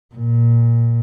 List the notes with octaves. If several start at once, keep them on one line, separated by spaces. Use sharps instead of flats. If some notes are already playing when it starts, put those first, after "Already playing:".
A#2